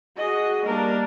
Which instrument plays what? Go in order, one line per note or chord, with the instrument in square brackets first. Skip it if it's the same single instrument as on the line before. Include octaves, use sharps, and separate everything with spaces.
[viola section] F#4 G#4 D#5
G3 A#3 D4 A#4